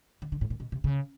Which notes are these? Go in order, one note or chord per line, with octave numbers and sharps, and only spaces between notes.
D#3
D3
A2
A#2
B2
C3
C#3